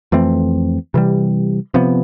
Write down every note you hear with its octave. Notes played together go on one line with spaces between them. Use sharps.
F2 E3 A3 C4
C3 E3 G3
C3 F3 B3